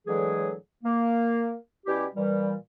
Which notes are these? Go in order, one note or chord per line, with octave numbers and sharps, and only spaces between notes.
A2 D3 E3 F#3 G#3 G#4
A#3
B2 G3 C#4 E4 G4
A#2 E3 G3